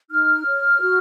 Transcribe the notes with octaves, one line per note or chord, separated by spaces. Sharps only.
D#4 F6
C#5
F#4